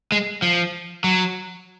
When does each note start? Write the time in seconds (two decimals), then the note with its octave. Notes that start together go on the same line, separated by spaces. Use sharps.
0.12 G#3
0.42 F3
1.04 F#3